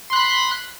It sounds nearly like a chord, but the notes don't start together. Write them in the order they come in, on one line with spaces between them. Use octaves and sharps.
C6 F#6 B5